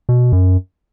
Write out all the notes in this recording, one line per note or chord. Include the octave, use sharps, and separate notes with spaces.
B2
F#2